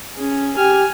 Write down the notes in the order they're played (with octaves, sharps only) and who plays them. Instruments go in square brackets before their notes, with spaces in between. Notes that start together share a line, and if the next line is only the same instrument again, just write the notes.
[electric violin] C#4 G#4
[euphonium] G4 [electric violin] G#5 F6